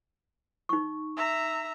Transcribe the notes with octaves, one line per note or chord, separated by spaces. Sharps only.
D#4 C#6
E5 A#5